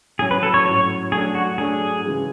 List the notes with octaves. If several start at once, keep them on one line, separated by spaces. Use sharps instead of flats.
A2 F#3 C#4 G#4
B4
A4
C#5
A2 F#3 C#4 C#5
F#3 A3 D4 G#4
F#4
F#3 A3 D4 G#4
C#3 E3 G#3